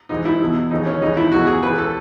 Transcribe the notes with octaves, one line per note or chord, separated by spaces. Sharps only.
G#2 E3 D#4
E4
E2 B2
D#2 C#3 E3 D#4
C#4
C#2 C#3 E3 D#4
E4
E2 C#3 E3 F#4
G#4
C#2 C#3 E3 B4
A4